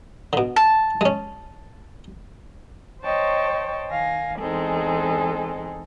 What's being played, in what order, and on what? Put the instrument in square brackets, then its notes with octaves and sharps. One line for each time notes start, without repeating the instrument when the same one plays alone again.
[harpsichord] B2 D3
[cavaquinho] A5
[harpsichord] G#3 C#4
[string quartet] C5 C#5 D#5 G5 A5 C#6
D#3 F5 G#5 A#6
E2 G#3 C4 D#4 G#4 A4